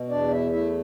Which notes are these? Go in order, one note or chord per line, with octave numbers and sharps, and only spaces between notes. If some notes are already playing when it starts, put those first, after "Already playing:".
Already playing: B2
E2 D4 D5
E4 E5
A3 E4 E5